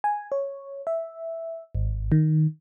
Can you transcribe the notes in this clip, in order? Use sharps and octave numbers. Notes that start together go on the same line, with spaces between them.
G#5
C#5
E5
G#1
D#3